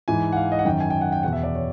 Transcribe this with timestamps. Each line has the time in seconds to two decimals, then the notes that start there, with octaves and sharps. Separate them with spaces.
0.08 G#2 E3 G#5
0.32 F#5
0.36 F5
0.52 D#5
0.59 F#5
0.65 F#2 D#3 G5
0.80 G#5
0.90 G5
1.01 F#5
1.12 G5
1.23 E2 B2 F#5
1.33 E5
1.43 D5
1.55 C#5